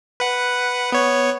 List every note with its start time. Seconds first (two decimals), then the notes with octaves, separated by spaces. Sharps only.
0.20 B4 F#5
0.92 B3 C#5